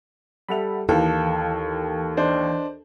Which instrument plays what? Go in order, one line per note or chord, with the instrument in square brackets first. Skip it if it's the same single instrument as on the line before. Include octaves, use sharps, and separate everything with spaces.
[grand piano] G3 A4 F7 [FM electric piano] E5 F#5 B5
[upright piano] D#2 [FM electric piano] E3 [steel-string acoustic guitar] A4 [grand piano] F5
[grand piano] D4 C5 D#5